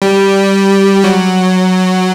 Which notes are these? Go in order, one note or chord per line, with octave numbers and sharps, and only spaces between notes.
G3
F#3